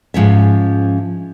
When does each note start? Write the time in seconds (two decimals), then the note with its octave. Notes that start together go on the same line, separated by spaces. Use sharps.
0.14 G#2 F3 C#4 E5